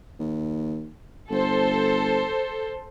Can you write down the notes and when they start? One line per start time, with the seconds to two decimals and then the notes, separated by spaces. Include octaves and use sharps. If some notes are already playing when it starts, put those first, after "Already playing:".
0.19 D#2
1.30 G1 A4 C5